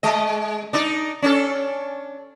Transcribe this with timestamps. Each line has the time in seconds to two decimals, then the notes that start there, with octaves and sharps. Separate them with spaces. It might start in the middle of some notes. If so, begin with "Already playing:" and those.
0.03 G#3 D#5
0.73 D4 D#4 D5
1.22 C#4 D4 A4